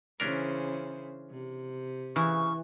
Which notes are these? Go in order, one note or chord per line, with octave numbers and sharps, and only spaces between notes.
C#3 E3 C#4 D4 A#4 C5
C3
C#3 E3 C#6